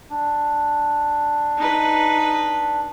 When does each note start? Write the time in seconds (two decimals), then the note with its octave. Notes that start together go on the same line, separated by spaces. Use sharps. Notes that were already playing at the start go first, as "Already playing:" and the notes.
0.10 D4
1.57 D#4 B4